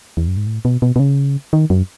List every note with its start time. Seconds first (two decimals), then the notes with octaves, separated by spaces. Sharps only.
0.17 E2
0.28 F#2
0.37 G#2
0.47 A2
0.65 B2
0.82 B2
0.96 B2
1.00 C#3
1.53 D#3
1.70 F#2